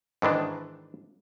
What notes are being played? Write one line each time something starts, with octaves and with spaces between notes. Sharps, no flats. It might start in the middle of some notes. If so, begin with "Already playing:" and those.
G#2 D#3 E3 D4